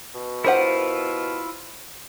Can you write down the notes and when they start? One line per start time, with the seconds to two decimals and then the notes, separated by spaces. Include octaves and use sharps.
0.14 B2
0.44 E4 F4 A#4 C5 F#5